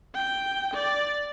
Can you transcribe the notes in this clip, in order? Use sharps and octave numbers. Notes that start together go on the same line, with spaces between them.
G5
D5